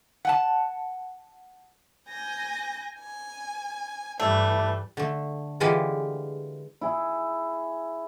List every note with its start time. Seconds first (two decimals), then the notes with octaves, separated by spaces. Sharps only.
0.25 F#5 G#5 A5
2.08 G#5 G6 A#6
2.98 G#5
4.20 G2 E3 G3 A3
4.97 D3 A3
5.60 D3 E3 G#3 F4 G4 G#4
6.81 E4 G#4